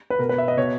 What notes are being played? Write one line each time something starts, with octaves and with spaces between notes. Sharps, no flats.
B4
B2 A#4
B4
E5
D#5
B2 C#5